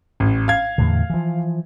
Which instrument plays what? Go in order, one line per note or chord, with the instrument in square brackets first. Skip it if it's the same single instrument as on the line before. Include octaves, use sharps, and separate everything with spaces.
[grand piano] A1
F5 G#6
[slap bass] E2 A2 D3
E3 F3